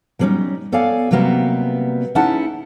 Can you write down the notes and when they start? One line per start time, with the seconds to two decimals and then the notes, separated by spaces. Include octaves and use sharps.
0.19 F#3 G3 A#3 C4 C#4 D#4
0.72 B3 A4 C#5 D5 F5 G#5
1.11 C3 F#3 G3 A#3 B3
2.15 C#4 D#4 E4 G#4 F#5 A5